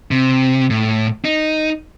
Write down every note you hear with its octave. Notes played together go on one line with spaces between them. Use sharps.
C3
A2
D#4